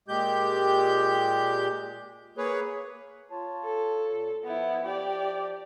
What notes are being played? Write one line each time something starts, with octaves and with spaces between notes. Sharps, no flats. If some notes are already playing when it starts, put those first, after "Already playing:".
A#2 G#3 G4 G6
A#3 G#4 B4 C#5
F4 C#5 A5
A4
A#2
F3 B3 E4
G4 D5